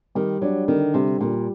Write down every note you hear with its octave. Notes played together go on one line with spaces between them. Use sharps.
D#3 G3
F#3 D4
D3 D#3
C3 G3
A#2 G3